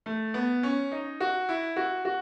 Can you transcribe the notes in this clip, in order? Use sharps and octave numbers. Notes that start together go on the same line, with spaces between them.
A3
B3
C#4
D#4
F#4
E4
F#4
F#4